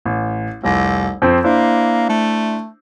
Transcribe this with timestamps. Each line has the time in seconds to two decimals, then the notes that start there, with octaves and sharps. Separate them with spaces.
0.05 A1
0.64 F1 C2
1.22 F2 C4 C5
1.44 A#3 D4 E4 C5
2.09 A3